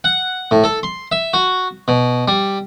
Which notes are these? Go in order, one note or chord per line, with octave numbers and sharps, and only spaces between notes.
F#5
A2
A4
C6
E5
F#4
B2
G3